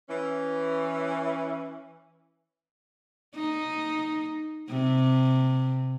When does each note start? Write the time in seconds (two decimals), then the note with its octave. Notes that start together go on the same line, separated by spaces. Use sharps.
0.09 E3 C#4
3.35 D#4
4.69 C3